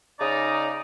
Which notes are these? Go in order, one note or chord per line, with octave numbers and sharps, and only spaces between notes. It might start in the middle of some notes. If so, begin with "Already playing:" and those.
C#3 D#4 D5 D#5